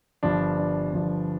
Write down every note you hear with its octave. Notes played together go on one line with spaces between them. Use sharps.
G1 G2 F3 D4
D4
G1 G2 F3